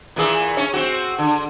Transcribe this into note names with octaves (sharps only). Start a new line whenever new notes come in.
A#2 E3 G#4
C#4 C#5
C4 F#4
D3